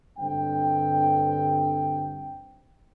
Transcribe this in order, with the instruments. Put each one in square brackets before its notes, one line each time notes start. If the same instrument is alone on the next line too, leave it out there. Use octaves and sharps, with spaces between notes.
[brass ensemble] G2 D3 C4 G5